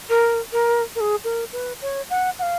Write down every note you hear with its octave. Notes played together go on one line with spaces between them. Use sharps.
A#4
A#4
A#4
G#4
A#4
B4
C#5
F#5
F#5
F5